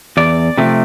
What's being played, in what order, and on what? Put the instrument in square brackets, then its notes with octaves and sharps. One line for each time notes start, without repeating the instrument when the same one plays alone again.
[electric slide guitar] E2 D5
C3 F3 A3